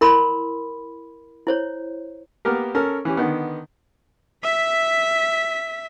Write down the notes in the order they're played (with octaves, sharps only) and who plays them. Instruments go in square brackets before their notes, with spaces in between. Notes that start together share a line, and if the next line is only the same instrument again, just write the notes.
[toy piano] E4 A#4 B5 C6
E4 C5 C#5
[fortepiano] A#3 B3 G4 A#4
C#4 A4 A#4
E3 C#4 G4
D3 D#3 B3
[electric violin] E5 B6